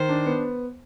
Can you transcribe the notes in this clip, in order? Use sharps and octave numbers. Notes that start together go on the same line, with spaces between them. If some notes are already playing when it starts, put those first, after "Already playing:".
Already playing: D#3 C5
D4
B3